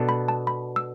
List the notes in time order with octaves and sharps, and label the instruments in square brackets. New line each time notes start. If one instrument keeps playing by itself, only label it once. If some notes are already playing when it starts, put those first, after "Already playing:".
Already playing: [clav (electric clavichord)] B2 B3 D4 A4
[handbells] B5
A5
B5
E6